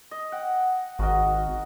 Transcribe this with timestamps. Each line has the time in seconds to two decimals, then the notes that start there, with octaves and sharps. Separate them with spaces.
0.11 D#5
0.32 F#5 G5
0.99 G#1 F#4 A#4 D#5